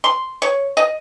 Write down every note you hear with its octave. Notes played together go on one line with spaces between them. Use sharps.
C6
C#5
D#5